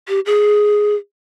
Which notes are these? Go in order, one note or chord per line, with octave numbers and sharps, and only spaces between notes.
G4
G#4